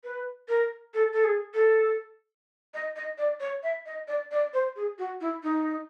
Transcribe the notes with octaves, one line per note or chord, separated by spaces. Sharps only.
B4
A#4
A4
A4
G#4
A4
D#5
D#5
D5
C#5
E5
D#5
D5
D5
C5
G#4
F#4
E4
D#4